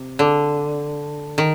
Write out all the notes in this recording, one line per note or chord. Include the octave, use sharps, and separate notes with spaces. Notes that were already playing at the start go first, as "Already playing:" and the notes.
Already playing: C3
D3
D#3